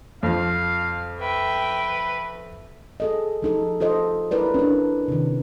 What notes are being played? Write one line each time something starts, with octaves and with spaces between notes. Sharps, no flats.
F2 F3 F5
B4 E5 G5
G#4 A4 D#5
F3 D#4 A4
F4 A4 C5 D#5
E4 A#4 B4 D5
C#4 D4
C3 D#3